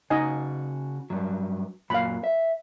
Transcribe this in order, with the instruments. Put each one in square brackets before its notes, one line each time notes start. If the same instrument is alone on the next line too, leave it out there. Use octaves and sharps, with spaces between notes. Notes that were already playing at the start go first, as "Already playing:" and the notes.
[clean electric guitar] C#3 F#4 [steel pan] D#4 D#5 G#5
[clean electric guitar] G2 F#3
[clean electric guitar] F#2 A#2 F#3 [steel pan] F5 B5
[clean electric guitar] E5